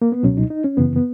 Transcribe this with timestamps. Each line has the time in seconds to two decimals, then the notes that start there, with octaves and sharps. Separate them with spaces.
0.02 A#3
0.12 B3
0.23 C#2 B2 F#3 C#4
0.37 D#4
0.50 D#4
0.64 C#4
0.77 F#2 C#3 E3 B3
0.96 B3